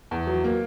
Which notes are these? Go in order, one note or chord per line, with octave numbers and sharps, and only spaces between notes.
E2
F#3
A#3